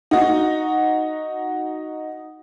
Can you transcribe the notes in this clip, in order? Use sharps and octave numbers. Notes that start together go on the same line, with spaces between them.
D#4 F#4